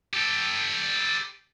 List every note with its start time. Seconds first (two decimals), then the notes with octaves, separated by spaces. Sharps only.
0.13 G4 A4